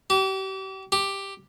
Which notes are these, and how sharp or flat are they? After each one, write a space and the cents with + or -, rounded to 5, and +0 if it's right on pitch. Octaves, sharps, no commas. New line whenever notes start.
G4 -35
G4 +5